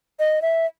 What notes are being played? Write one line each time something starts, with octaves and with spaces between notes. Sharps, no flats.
D#5
E5